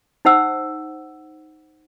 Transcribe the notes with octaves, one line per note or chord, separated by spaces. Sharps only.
D#4 C5 F#5 E6